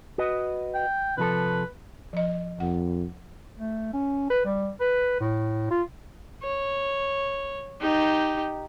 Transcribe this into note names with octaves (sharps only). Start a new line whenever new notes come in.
F#4 B4 D#5
G5
C3 F3 A4 B4
F3 D#5
F2 F#5
A3
C#4
B4
G3
B4
A2
F4
C#5
D#4 G4